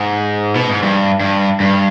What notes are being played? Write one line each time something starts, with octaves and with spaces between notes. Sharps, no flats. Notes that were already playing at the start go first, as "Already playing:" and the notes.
Already playing: G#2
B2
G#2
G2
G2
G2